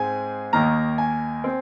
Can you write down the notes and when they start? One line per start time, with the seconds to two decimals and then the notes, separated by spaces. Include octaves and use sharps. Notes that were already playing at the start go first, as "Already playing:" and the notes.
Already playing: G#2 G#3 C4 G#5
0.53 D#2 D#3 A#3 A#5
0.98 G#5
1.44 C4